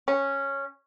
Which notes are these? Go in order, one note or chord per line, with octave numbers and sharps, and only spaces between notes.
C#4